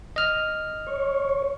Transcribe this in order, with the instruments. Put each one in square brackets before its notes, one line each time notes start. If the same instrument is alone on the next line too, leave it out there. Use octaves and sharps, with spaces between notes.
[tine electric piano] D#5 F6
[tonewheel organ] C#5